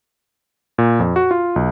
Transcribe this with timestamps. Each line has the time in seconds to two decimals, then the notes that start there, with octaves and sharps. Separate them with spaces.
0.78 A#2
1.00 F2
1.16 F#4
1.31 F4
1.56 B1